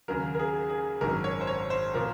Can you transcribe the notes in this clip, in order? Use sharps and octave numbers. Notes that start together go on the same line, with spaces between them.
D#2 C#3 F#3 A#4
A#4
G#4
G#4
G#1 F#2 D#3 F#3 A#4
C#5
C5
C#5
C5
A#2 F3 A#4